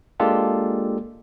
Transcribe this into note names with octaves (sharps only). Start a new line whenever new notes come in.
G#3 A#3 D4 F4 G4 A4